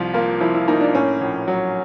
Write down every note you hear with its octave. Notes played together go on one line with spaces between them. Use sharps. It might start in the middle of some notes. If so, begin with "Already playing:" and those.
Already playing: C2 C3 F3
A#3 F4
F3 E4
E4
A#3 D#4
D4
A2 C#4
A#1
F#3